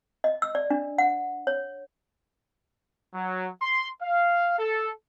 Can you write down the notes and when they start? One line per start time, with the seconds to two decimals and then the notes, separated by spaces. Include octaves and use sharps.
0.24 D#5
0.42 E6
0.55 D5
0.70 D4
0.98 F#5
1.47 C#5
3.14 F#3
3.62 C6
4.02 F5
4.59 A4